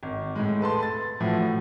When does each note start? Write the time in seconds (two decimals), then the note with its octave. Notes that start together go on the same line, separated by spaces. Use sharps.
0.03 G#1
0.35 A2 G#3
0.61 A4 B4 A5 C6
0.83 A6
1.20 A2 E3 F3 A3 F#4